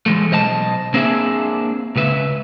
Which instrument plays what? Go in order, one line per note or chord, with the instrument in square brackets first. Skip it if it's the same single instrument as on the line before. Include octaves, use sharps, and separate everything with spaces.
[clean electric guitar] E3 G#3 A3
B1 C5 D#5 F5 A5
A#3 C4 D4 G#4 E5
C#2 C#3 B4 E5